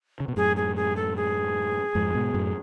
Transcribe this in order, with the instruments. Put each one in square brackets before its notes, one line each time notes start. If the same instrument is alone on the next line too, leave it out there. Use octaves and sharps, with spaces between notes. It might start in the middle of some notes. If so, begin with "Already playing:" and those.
[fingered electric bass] C#3
B2
[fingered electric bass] F#2 A2 [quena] G#4
[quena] G#4
G#4
A4
G#4
[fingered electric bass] F2 G#2
G#2 B2
F#2 A2